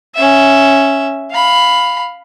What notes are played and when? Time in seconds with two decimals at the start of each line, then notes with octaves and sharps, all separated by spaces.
0.15 C#4 E5
1.31 F5 B5